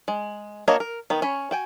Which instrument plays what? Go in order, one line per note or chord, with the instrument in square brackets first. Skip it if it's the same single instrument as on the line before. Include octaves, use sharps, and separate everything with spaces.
[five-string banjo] G#3
A#3 D4 F#4 C#5 D#5
A#4
D#3 B3
C#4 C#5 B5
F#4 G5 G#5